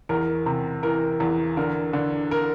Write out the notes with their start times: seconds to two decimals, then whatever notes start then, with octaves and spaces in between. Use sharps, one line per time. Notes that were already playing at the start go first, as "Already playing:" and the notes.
0.09 E2 A#4
0.46 C3
0.83 E3 A#4
1.20 E2
1.57 D3 A#4
1.93 D3
2.31 A#4